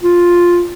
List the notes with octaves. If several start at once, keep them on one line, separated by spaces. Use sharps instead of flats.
F4